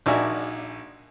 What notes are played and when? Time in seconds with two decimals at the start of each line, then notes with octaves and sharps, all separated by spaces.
0.06 A#1 D#4 F#4 D5 E5 G#5